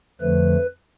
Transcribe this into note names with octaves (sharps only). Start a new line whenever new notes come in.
F2 D3 F3 A3 B4